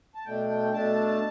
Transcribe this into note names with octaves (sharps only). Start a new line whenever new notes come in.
A5
B2 A3 D4 G5
G5
B2 A3 D4 A5